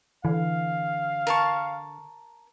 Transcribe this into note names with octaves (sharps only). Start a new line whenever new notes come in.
D3 E3 F5
A#4 A5 C#6